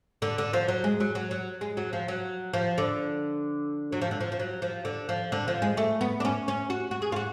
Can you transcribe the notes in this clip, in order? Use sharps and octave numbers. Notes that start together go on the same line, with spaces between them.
D3
D3
F3
F#3
G#3
F#3
F#3
F#3
G#3
F#3
F3
F#3
F3
D3
F#3
F3
D3
F3
F3
F#3
F3
D3
F3
D3
F3
G#3
A3
B3
D4
C#4
C#4
F#4
F#4
G#4
F4
F#4